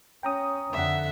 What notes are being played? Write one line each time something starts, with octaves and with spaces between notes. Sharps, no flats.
C#4 G5 A#5 D#6
F2 D3 E5 F#5